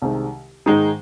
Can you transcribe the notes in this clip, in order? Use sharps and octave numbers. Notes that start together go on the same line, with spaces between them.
C2 C3 D#3 G#3
G#2 D#3 G#3 D#4 G#4